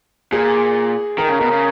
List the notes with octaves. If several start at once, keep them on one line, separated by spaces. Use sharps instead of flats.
A#2 G#4
D#3 A#4
C#3
B2 A#4
C#3